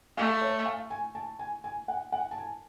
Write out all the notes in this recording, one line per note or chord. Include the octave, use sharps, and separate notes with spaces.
A3 F5
C#5
F5
G#5
A5
G#5
G#5
F#5
F#5
A5
G#5